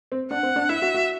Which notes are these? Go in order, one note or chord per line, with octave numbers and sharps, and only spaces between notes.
C4
D4 F#5
C4
D4
E4 E5
F#4
F#4